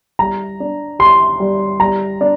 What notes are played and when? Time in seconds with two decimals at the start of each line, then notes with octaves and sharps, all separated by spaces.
0.19 G3 A#5
0.60 D4
0.99 G4 C6
1.40 G3
1.80 G3 A#5
2.21 D4